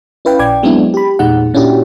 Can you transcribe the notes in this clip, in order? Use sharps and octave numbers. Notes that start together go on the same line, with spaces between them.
C#4 E4 B4 F5 G5
A#1 D5 G5 D6 G#6
F#3 G#3 B3 C4 D4 E4
G4 B5
E2 A#2 G#3 D#4 F#5
A#2 C#4 D4 E4 F#4 G4